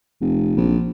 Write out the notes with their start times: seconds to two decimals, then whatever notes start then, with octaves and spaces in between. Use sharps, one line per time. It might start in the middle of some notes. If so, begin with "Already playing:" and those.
0.21 F1
0.57 A#1